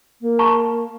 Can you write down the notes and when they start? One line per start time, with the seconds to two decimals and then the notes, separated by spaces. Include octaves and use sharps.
0.21 A#3
0.39 A5 A#5 C#6